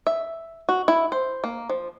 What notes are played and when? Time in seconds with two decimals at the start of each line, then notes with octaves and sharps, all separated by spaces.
0.07 E5
0.69 F#4
0.88 E4
1.12 C5
1.44 A#3
1.70 F3